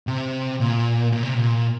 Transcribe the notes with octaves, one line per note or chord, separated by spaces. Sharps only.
C3
A#2
A#2
C3
A#2